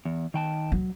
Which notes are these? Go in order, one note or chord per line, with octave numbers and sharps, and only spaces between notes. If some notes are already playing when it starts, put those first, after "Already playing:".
E2
D#3 G5 A5
F#3